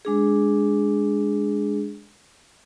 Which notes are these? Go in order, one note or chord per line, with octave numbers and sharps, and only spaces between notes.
G#3 D4 G#4